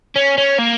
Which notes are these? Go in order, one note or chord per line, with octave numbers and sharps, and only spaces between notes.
C#4
C#4
A#3